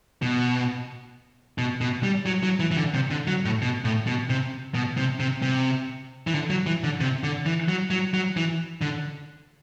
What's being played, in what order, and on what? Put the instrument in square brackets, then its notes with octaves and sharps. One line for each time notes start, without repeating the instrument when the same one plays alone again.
[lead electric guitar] B2
B2
B2
G3
F#3
F#3
E3
E3
D3
C3
D3
F#3
A2
B2
A2
B2
C3
B2
C3
C3
C3
E3
D3
F#3
E3
D3
C3
D3
E3
F#3
F#3
F#3
E3
D3